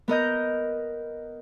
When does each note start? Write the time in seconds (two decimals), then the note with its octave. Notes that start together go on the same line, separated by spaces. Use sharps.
0.08 B3 A#4 D#5 G6